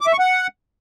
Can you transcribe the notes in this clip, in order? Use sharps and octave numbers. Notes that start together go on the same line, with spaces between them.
D6
E5
C#6
F#5